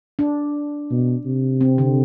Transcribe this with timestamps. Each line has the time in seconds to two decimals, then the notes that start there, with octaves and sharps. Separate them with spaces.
0.19 D4
0.90 B2
1.25 C3
1.61 C4
1.78 D3